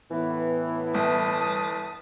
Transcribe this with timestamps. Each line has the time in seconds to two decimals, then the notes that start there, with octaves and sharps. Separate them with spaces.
0.12 A2 E3 B3 E4
0.94 G1 A5 D#6